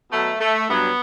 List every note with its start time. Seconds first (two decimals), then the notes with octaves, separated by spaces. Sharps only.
0.11 B2 F#3 A3
0.40 A3
0.69 G2 F#3 B3